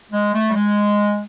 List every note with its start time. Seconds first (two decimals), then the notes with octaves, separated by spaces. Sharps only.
0.11 G#3
0.34 A3
0.49 G3
0.54 G#3